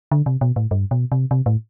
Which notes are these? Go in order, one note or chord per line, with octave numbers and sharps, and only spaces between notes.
D3
C3
B2
A2
G2
B2
C3
C3
A2